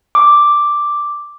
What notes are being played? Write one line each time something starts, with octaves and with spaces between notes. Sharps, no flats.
D6